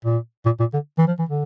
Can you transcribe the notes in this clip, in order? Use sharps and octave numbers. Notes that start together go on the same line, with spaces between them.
A#2
A#2
A#2
D3
E3
F3
E3
D3